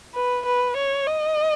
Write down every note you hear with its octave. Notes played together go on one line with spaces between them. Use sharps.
B4
B4
C#5
D#5